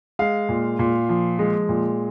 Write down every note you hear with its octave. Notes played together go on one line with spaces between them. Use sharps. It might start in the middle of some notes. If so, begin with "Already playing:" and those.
G#3 F5
A#2
A#2
F3
G#3
A#2